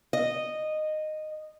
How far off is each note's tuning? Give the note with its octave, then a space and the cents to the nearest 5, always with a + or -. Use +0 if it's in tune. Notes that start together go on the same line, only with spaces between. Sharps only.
D#5 -10